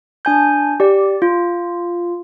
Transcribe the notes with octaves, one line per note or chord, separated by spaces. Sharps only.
D4 G#5 G6
G4 D5
F4